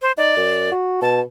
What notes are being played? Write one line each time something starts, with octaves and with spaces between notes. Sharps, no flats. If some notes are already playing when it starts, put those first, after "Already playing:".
C5
D#4 D5
F#2
F#4
B2 A5